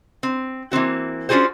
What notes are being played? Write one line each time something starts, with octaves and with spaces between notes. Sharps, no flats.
C4
E3 A#3 C4 F#4
C#4 D4 F4 F#4 G#4 C5